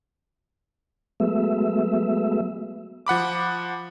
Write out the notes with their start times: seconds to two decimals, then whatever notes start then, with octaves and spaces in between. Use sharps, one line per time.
1.20 F#3 G#3 A3 B3 E5
3.07 F3 F#5 B5 D6